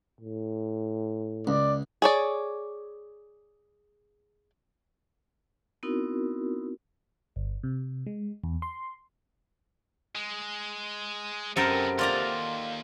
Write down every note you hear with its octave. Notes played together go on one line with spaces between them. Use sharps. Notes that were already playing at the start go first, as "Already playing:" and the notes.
A2
C#2 D5
G#4 C#5 D5
B3 C4 D#4 E4 F#4 A#4
G1
C3
G#3
E2
C6
G#3
F#2 C3 B3 C4 A4 A#4 G5
D#2 F4 D5 A#5